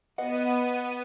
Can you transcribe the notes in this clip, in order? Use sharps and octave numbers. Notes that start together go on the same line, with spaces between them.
B3 B4 D#5 F#5 D#7